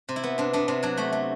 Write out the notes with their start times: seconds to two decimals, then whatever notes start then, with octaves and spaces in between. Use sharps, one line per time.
0.09 C3
0.16 E4
0.23 B3
0.38 C3 D4
0.53 B3 D4
0.68 C3 D4
0.83 F#3 D4
0.98 A3 F#4
1.13 A3